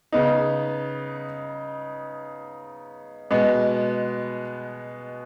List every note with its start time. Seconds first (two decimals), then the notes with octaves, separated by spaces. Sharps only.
0.12 C#3 B3 D#4
3.31 B2 G#3 B3